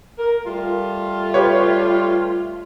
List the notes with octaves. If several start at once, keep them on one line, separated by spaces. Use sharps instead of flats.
A#4
G3 A3 F4
G4 B4 C#5